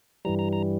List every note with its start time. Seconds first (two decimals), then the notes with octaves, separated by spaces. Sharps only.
0.25 G2 E3 G3 A#5
0.39 A#5
0.53 A#5